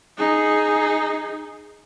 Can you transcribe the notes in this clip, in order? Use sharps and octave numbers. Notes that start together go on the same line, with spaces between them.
D#4 G#4